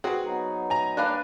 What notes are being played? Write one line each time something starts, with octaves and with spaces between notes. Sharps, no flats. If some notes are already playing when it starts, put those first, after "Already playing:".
C4 F#4 G#4 B4
F#3 B3 D#4
G#5 A#5
G3 A#3 D4 B4 F5